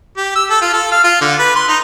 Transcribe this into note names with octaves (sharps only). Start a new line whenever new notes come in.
G4
E6
A4
F4
A4
F5
F4
D3
B4
C6
D#4